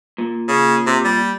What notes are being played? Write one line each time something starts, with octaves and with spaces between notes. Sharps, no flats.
A#2
C#3
C3
G3